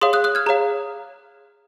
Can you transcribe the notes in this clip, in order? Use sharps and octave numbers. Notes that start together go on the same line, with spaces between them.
G#4 C#5 F5 C6 D#6
D#6 F#6
D#6 F#6
F6 G#6
G#4 C#5 F5 A#5